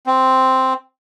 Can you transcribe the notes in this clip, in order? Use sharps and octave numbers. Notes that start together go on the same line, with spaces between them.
C4